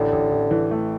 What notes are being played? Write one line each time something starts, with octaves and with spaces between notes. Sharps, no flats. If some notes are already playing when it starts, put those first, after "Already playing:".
Already playing: A1 D3
A1
A1
E3
A3